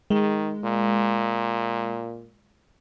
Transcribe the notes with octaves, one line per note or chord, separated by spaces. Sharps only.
D#3 G#3
A#2